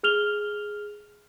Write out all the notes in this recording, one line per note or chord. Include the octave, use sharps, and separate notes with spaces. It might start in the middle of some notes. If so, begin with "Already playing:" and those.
G#4 F6 F7 G7